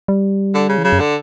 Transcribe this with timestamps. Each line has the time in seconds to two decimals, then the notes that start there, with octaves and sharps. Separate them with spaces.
0.08 G3
0.55 D3
0.69 C#3
0.78 E3
0.84 C#3 F#3
0.92 F#2
1.00 D3